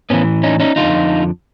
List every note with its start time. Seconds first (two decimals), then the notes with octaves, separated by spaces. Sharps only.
0.10 A2 E3 B3 C#4
0.43 C#4 D#4
0.60 C#4 D#4
0.76 F2 D3 F3 D#4 F4